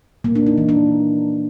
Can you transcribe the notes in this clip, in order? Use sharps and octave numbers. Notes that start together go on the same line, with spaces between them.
A#3
D4
D#4
E3
D4